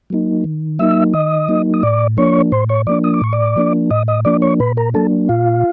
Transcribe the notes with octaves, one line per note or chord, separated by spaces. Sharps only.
F#3 A#3 D#4
D#3
F#3 A#3 D#4 E5 E6
D#3 D#5 D#6
F#3 A#3 D#4
D#6
A2 D5 D6
F3 A#3 D4 C#5 C#6
A2 C5 C6
C#5 C#6
F3 A#3 D4 D5 D6
D#6
D6
A2 C#6
D5 D6
F3 A#3 D4
A2 D#5 D#6
D#5 D#6
F3 A#3 D4 D5 D6
C#5 C#6
A#2 B4 B5
A#4 A#5
F#3 A#3 D4 A4 A5
A#2 F4 F5